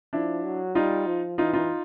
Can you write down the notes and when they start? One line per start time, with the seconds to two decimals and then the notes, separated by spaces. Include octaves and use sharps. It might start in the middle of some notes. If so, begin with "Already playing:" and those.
0.13 F3 D4 E4
0.44 F#3
0.75 G3 D#4 F4
1.07 F3
1.38 E3 D#4 F4
1.53 D#4 F4